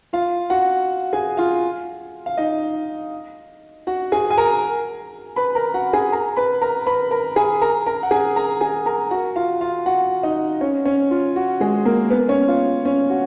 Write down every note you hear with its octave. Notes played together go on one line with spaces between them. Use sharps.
F4 F5
F#4 F#5
G#4 G#5
F4 F5
F5
D#4 D#5
F#4 F#5
G#4 G#5
G#5
A#4 A#5
B4 B5
A#4 A#5
F#4 F#5
G#4 G#5
A#4 A#5
B4 B5
A#4 A#5
B4 B5
A#4 A#5
G#4 G#5
A#4 A#5
A#4 A#5
F#5
G#4 G#5
A#4 A#5
G#4 G#5
A#4 A#5
F#4 F#5
F4 F5
F4 F5
F#4 F#5
D#4 D#5
C#4 C#5
C#4 C#5
F4
F#4
G#3 G#4
A#3 A#4
B3 B4
C#4 C#5
F4 F5
C#4 C#5
F#4